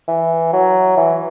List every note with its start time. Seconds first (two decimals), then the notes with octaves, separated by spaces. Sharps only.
0.08 E3
0.53 F#3
0.97 E3